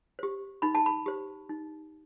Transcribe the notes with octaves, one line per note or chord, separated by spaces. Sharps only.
G4 C5
D#4 B5
A5
B5
G4 C5
D#4